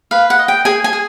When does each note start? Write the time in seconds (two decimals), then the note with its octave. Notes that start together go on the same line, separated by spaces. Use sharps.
0.11 B4 F5
0.30 F#5
0.39 D#5
0.48 G5
0.65 G#4 G#5
0.84 G#5
0.93 G#4